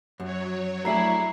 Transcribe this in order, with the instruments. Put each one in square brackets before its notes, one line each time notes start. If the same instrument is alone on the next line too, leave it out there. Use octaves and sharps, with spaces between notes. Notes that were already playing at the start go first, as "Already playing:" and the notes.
[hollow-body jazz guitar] F#2 [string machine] F#3 C#5
[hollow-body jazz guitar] A3 D4 G#4 [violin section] E4 [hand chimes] A#5 C7